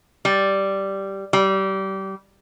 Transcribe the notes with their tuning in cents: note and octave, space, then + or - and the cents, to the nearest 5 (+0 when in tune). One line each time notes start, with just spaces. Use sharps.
G3 -5
G3 -25